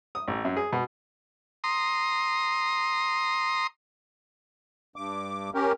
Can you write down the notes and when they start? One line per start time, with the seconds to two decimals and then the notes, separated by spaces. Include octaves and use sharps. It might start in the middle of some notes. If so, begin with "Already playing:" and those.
0.15 D#6
0.28 A1
0.45 F#2
0.57 G#4
0.73 B2
1.64 A#5 C6 D#6
4.96 G2 D6
5.54 C#4 G4 A#4